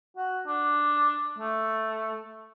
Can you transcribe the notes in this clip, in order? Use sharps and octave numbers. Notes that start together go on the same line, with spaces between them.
F#4
D4
A3